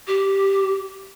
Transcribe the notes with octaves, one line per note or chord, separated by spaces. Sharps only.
G4